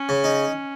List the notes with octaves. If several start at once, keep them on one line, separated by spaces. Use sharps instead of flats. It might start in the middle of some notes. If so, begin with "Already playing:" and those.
Already playing: C#4
C#3
D#4